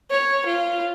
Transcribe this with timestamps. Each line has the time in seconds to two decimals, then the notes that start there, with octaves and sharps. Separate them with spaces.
0.11 C#5
0.46 F4